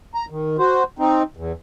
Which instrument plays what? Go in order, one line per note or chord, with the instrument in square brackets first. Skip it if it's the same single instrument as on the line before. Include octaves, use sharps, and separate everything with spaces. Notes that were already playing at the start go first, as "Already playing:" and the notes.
[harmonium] A#5
D#3
F#4 C5
C4 D#4
E2